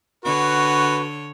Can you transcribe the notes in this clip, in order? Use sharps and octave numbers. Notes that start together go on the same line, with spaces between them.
D3 F#4 B4 C#5